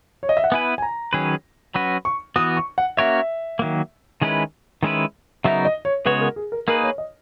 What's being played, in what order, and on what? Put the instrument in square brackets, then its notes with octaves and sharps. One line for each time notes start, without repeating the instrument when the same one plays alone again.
[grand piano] C#5
D#5
E5
F#5
[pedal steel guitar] B3 E4 B4 [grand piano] G#5
[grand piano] G#5
A#5
[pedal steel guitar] D#3 F#3 C#4 G#4 B4
[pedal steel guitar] F#3 C#4 F#4 B4 [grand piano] B5
[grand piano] C#6
[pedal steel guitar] E3 B3 F#4 [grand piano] D#6
[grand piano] C#6
F#5
[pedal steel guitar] A#3 C#4 F#4 A#4 C#5 [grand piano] E5
[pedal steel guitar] D#3 F#3 A#3
D#3 G#3 C#4 E4 B4
D#3 G#3 C#4 E4 B4
[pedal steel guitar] C#3 F#3 B3 D#4 A#4 [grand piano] E5
[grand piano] D#5
C#5
[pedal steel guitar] C#3 G#3 B3 F#4 C#5 [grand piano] B4
[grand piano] A#4
G#4
A#4
[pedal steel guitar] A#3 D#4 G#4 B4 [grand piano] A#4
[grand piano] C#5
D#5